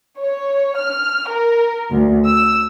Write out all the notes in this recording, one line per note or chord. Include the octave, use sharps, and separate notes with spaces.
C#5
F6
A#4
D2
E6